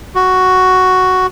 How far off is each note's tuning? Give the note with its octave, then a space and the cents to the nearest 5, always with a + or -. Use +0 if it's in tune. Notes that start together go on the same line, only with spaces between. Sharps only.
F#4 +5